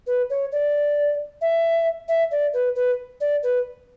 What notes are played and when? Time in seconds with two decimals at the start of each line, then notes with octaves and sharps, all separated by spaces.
0.07 B4
0.30 C#5
0.52 D5
1.41 E5
2.08 E5
2.31 D5
2.54 B4
2.76 B4
3.21 D5
3.43 B4